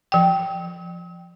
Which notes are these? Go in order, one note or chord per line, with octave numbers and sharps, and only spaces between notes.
F3 G5